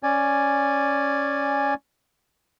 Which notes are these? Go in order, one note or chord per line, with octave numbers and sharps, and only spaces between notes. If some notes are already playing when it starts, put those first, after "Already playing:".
C#4 D5 G#5